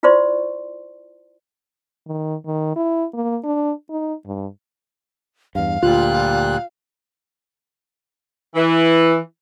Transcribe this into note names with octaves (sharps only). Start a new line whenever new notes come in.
E4 F4 C5 D5 C6 C#6
D#3
D#3
E4
A#3
D4
D#4
G2
E2 G2 F5
D2 A#2 G3 F4 F#6
E3